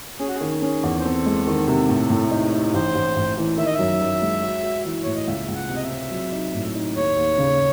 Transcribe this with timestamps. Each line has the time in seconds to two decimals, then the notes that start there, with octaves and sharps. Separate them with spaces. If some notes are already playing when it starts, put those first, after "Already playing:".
0.20 C#4 G#4
0.28 F#4
0.35 G#4
0.41 D#3
0.62 C#4 G#4
0.83 E2
1.00 C5
1.05 C4 A4
1.26 G#3
1.47 D#3
1.67 C3
1.89 A2
2.10 A2
2.31 D#4
2.52 D#4
2.74 A1 C5
2.95 A1
3.16 A1
3.37 E3
3.57 D#3 E5
3.66 D#5
3.74 F#2 E5
4.01 F#2
4.22 G#3
4.43 F#4
4.63 F#4
4.85 E3
5.03 A2 C#5
5.15 D#5
5.27 C#2 E5
5.48 C#2
5.55 F#5
5.69 C3
5.76 D#5
5.84 E5
5.90 C4
6.11 F#3
6.32 D#4
6.54 A2
6.75 D#4
6.96 D#2 C#5
7.17 D#2
7.38 C#3